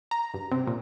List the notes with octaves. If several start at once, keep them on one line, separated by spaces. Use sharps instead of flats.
A#5
G2
C3
A#2